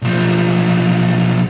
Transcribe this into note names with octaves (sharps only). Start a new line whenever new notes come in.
B1 F3